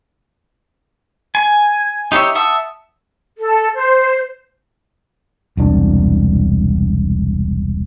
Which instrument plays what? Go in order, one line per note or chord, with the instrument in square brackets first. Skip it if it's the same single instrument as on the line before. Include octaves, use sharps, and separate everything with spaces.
[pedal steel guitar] G#5
D#4 G4 C#5 E5
E5 F#5 A5 D#6 E6
[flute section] A4
C5
[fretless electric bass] E1 C2 D4